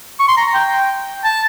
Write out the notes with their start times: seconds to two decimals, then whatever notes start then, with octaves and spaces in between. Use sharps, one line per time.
0.20 C#6
0.28 C6
0.37 A#5
0.54 G5
1.24 A5